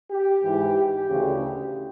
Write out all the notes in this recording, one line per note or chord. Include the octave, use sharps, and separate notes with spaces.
G4
G#2 E3
G4
D2 C#3 E3